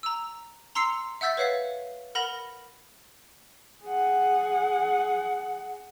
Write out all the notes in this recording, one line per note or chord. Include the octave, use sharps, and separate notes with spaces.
A#5 E6
A#5 C6 E6 C7 C#7 F7
E5 F#5 E6 G6 A6 B6
B4 C#5 F5 F#5 B6
A#4 F#5 B5 A#6 F7
G#4 F#5